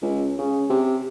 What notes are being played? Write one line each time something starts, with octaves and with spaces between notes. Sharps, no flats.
C#2
C#3
C3